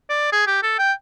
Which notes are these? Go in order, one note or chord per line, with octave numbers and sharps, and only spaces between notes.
D5
G#4
G4
A4
G5